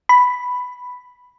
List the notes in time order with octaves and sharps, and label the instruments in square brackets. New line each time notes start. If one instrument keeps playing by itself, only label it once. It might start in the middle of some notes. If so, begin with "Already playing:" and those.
[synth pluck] B5